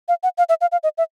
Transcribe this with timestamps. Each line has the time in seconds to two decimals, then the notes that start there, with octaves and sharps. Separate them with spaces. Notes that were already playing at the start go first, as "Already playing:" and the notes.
0.08 F5
0.23 F#5
0.38 F5
0.49 E5
0.61 F5
0.72 F5
0.83 D#5
0.98 E5